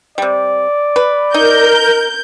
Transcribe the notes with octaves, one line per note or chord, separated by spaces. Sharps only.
C3 G3 D5
B4
D#4 A#4 G6